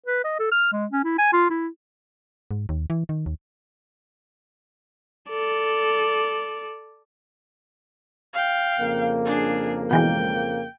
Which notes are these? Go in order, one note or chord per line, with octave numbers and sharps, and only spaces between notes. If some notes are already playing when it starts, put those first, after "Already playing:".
B4
D#5
A4
F6
G#3
C#4
E4
G#5
F4
E4
G#2
D#2
E3
D#3
D#2
A4 D5
F5 G5
F2 C#3 A#3
D4 G#4
B2 E3 G#3 G5